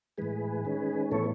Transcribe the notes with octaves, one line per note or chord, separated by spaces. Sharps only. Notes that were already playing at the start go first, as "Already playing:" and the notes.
A2 E3 G#3 G#4 B4
D#3 G#3 C#4
A2 E3 B3 A4 C#5